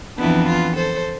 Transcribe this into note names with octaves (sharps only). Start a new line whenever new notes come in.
F2 E3 B3 D4 E4
F4
A4 C5